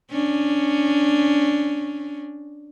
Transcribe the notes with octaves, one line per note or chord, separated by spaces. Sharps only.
C#4 D4